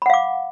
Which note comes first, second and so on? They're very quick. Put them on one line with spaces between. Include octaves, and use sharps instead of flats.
B5 F#5 F5 D6